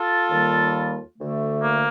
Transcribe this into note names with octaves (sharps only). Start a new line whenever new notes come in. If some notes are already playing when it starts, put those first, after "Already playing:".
Already playing: F4 A4
D#2 D#3 G3 A#3
D2 D3 A3
A#3